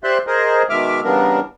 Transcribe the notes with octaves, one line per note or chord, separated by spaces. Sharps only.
G4 C5 D5 E5 C6 F#6
G#4 A#4 C5 D#5
B2 D#3 G#3 E5 D6 F6
C#3 E3 G3 B3 D4 A#4